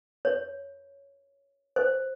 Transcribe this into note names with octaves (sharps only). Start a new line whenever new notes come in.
C#5
C5